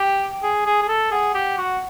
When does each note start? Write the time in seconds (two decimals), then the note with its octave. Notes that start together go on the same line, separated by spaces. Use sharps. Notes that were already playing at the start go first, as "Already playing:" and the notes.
Already playing: G4 G5
0.43 G#4
0.66 G#4
0.82 G#4
0.88 A4
1.12 G#4 F#5
1.34 G4
1.58 F#4